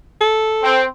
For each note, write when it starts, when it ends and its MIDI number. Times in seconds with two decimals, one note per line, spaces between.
0.21 0.81 69
0.63 0.85 60